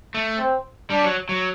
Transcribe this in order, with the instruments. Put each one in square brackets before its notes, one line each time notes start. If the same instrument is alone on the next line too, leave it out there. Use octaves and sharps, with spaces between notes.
[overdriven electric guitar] A3
[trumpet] C4
[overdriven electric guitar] G3 [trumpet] D4
[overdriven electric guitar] F#3
F#3